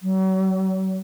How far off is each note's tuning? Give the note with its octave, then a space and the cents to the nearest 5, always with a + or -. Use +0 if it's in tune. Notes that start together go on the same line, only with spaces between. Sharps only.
F#3 +40